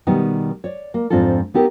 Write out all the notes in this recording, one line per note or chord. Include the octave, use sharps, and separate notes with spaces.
B2 D#3 G3 B3 D#4
C#5 D5
A#3
F2 G#2 C4 D4 F4 A4
B3 D#4 G4 A4 A#4